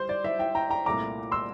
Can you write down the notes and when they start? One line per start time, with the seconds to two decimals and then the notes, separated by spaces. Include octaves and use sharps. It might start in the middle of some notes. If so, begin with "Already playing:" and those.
Already playing: G3 C5
0.09 D5
0.24 C5 E5
0.39 E5 G5
0.55 G5 A#5
0.70 G5 A#5
0.85 C2 A#2 A3 E4 A#5 D6
1.32 C6 E6